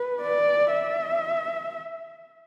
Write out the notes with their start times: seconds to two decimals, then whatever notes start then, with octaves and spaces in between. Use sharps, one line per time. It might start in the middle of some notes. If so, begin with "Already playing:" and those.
Already playing: B4
0.22 D5
0.73 E5